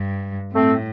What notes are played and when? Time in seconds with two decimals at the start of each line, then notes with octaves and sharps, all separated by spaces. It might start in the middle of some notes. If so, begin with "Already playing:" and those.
Already playing: G2
0.53 A2 A3 C4